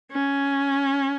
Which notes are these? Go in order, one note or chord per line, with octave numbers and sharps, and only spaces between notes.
C#4